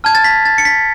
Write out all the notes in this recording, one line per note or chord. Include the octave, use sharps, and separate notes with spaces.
A5 F6 G#6
A6
B6
A6
C#7
B6